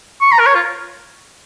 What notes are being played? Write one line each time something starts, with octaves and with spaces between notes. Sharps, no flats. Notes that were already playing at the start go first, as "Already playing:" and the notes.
C#6
A#5
A#4
C#5
F4